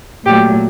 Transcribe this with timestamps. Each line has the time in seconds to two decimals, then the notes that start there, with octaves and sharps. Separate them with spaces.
0.25 A#2 F#3 A3 G4